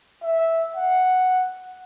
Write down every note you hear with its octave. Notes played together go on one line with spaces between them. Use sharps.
E5
F#5